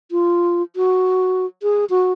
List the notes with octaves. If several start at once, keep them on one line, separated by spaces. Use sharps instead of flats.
F4
F#4
G#4
F#4